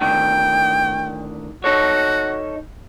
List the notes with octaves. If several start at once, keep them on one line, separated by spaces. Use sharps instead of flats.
A2 D3 D#3 G5
D#4 F#4 A4 C#5